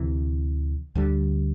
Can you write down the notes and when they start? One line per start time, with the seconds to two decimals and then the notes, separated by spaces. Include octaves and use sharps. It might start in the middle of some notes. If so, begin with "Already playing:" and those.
Already playing: D2 C3 E3
0.95 D2 D3 G3